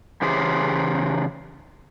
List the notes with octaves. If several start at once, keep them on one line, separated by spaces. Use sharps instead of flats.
C#3 E3 G4 G#4 C5